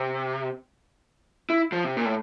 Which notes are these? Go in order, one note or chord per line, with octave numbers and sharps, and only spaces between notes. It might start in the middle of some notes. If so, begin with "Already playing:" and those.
Already playing: C3
E4
F3
C3
A#2
A2